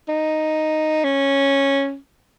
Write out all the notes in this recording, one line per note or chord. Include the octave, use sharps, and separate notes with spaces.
D#4
C#4